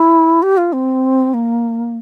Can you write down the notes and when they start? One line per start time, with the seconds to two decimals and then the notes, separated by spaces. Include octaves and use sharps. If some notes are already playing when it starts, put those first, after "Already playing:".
Already playing: E4
0.42 G4
0.57 F4
0.73 C4
1.34 A#3